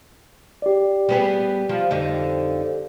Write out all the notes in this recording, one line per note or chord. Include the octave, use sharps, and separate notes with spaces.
G4 D5
G3 B3 G#4
F3
F2 D3 D#4